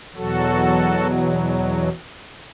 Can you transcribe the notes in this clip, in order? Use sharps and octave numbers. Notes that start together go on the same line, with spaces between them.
E2 B2 F#3 F#4 A4